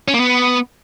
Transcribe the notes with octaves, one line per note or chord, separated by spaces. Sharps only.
C#4
A#3
B3